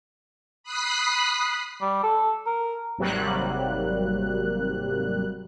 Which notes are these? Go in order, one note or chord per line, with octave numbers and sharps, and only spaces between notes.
B5 D#6 F#6 B6 C7
G3
A4
A#4
G#1 C3 F#3 G3 A#3 F#6